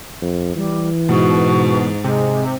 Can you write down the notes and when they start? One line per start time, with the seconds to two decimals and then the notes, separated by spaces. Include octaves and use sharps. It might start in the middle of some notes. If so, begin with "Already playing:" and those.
0.22 F2
0.56 E3 G3
1.09 G#2 B2 F#4
2.04 C3 G#3